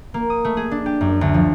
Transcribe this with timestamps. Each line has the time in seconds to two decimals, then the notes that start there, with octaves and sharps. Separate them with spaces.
0.14 A#3
0.30 D#6
0.44 A3
0.57 G#4
0.71 D4
0.86 G4
1.01 F#2
1.21 D2
1.34 F3